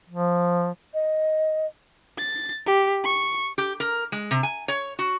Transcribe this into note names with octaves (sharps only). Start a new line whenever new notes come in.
F3
D#5
A6
G4
C#6
G4
A#4
G#3
C3
G#5
C#5
F#4